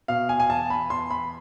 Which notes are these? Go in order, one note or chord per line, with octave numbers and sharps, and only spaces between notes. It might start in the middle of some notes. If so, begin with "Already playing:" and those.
B2 F5
G#5
G#5
E2 A5
B5
E2 C6
B5